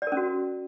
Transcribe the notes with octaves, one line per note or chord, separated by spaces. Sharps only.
D5
A#4
C#4
F#4